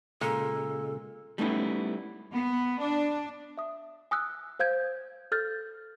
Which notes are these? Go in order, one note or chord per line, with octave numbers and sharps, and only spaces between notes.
A#2 C#3 G#3 A4
G3 A3 B3 C#4 D#4 E4
B3
D4
E5 D#6
G#5 D#6 E6 F#6
C5 F5 G6 G#6
A4 F6 G6 A6